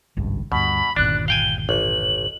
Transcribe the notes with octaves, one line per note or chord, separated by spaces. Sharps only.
G#1 C#2 G2
D2 G2 B2 B5
G1 D#2 A#2 D4 F#6
F5 G5 G#5 G7
A1 F#7